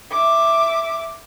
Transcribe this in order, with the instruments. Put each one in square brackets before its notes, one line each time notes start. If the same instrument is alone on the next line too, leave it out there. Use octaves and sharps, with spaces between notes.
[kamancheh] E5 D6